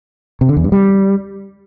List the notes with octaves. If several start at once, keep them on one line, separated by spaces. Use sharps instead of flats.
C3
D3
E2
G2
G3